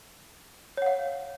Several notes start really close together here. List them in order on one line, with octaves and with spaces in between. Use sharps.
C#5 F#5 F5